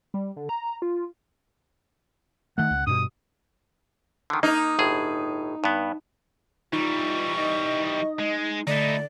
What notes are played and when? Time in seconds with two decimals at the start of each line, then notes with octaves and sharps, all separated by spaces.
0.14 G3
0.36 D3
0.49 A#5
0.82 F4
2.58 D#3 A3 F#5
2.70 C#2
2.87 G2 B2 D#6
4.30 D3 D#3
4.43 A#3 D#4
4.79 G1 A2 G#4
5.64 G2 B3
6.73 E3 G3 D#4 F4 C#6
7.37 D#4 D#5
8.19 G#3
8.67 D3 A3 D#4 E4 D5